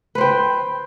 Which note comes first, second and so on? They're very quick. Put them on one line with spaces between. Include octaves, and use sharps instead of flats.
B4 C5 G5